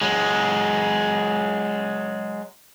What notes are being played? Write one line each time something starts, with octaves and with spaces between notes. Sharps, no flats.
F#3 G#3